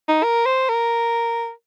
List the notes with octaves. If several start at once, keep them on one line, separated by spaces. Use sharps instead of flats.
D#4
A#4
C5
A#4